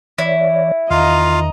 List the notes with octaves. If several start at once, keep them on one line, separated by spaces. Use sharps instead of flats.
E3 E4 C#5 D5
E2 D#3 F4 D#5 F5 A#5